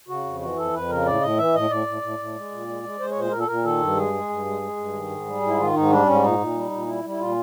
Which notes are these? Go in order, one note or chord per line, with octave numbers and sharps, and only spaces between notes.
C#3 F#4
F2
E3 F#4
F2 A4
F2 B4
C#3 A#4
A2 D5
A2 D#5
E3 E5
A2 D#5
A2 D5
A2
A2
A2
G#3
A#2
G#3
G#3
G#3 C5
C#5
A#2 C5
A#2 A#4
A4
A#2 A#4
D#3 A4
G2
G#3 G#4
G#3
G2
G#3
G#3
G2
D#3
G#2
G3
G#2
E4
D#3 F4
G#2 D#4
G3 D4
G#2 C#4
A#2 D#4
A#2
G3
A#2
G3 E4
G3
E4
A#2 F4